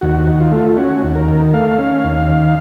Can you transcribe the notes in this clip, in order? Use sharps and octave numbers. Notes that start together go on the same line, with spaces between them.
D#2 F#4
D#3
F4
A3
C#4 F#4
D#2
A#4
D#3
A3 F5
C#4
D#2
D#3